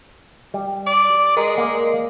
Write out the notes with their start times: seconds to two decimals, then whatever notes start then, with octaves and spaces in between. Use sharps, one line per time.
0.54 G3
0.87 D5
1.37 G#3 A#4
1.58 A#3 D5